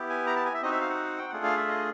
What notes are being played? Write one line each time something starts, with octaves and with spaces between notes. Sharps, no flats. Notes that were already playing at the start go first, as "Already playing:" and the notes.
Already playing: B3 E4 G4
G#5
A#5
A5
G#5
E5
C4 D#4 F#4 D#5
E5
F5
F#5
G5
A3 D4 F4 G#4 F#5
F5
E5
D#5